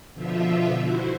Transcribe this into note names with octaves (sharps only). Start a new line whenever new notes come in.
B2 D3 F3 F4 E5
E4 F#4 C5